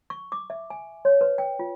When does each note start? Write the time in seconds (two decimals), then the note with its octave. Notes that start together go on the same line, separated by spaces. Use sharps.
0.10 C#6
0.32 D6
0.50 E5
0.70 G#5
1.05 C#5
1.21 B4
1.38 G5
1.59 F4